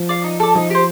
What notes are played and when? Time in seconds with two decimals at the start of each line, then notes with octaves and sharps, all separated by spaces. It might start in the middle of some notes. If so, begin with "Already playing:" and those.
Already playing: F3
0.09 D5 F5
0.24 D#4
0.40 A4 D5
0.55 F3 D#4
0.70 G4 C5